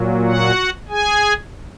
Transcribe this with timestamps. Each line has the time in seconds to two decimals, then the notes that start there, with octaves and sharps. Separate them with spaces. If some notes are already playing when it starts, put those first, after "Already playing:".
Already playing: A#2 F#3
0.26 F#4 F#5
0.89 G#4 G#5